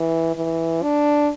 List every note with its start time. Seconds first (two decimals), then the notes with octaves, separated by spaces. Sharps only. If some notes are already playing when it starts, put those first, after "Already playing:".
Already playing: E3
0.36 E3
0.82 D4